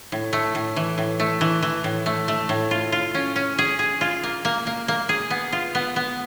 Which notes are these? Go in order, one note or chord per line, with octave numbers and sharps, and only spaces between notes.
A2
A3
A2
E3
A2
A3
E3
E3
A2
A3
A3
A2
F4
F4
C#4
C#4
G#4
G#4
F4
A#3
A#3
A#3
A#3
G#4
B3
F4
B3
B3